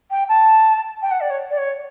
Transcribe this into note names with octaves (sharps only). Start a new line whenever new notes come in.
G5
A5
G5
F#5
D5
C#5
D5
C#5